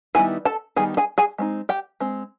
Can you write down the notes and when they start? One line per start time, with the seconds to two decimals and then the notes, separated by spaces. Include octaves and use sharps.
0.15 D#3 G3 B3 E4 G#4 G#5
0.45 A4 A5
0.76 D#3 G3 B3 G#4 G#5
0.97 G#4 G#5
1.18 G#4 G#5
1.38 G#3 C4 D#4
1.69 G4 G5
2.00 G#3 C4